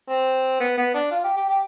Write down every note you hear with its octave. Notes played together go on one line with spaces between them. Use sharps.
C4
B3
B3
D4
F4
G4
G4
G4